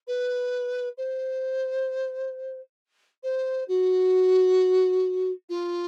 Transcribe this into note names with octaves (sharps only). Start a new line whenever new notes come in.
B4
C5
C5
F#4
F4